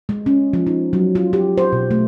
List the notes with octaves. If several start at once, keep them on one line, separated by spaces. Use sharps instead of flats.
G#3
C#4
F3
D#4
F#3
F4
G4
C5
B2
A3